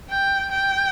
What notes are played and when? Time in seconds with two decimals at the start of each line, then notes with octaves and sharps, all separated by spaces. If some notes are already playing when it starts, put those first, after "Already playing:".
0.10 G5
0.51 G5